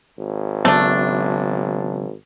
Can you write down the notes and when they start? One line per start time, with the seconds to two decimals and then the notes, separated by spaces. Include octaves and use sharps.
0.18 G#1
0.65 C#3 F#3 A3 B3 D4